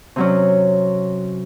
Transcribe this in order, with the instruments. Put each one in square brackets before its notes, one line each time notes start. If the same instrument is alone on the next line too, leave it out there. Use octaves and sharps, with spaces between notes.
[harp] C3 F#3 C#4